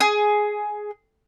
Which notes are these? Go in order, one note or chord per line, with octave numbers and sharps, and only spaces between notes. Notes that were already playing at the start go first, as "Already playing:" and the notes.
G#4